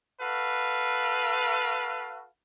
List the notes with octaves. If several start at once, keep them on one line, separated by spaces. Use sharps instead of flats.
F#4 A4 B4 F5